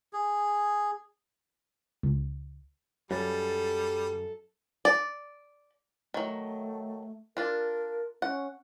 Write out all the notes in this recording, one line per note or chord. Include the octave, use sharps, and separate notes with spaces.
G#4
C#2
F#2 F#3 G3 A4 B4 A6
D5
D#3 F#3 A3
D4 F4 A#4
C#4 F#5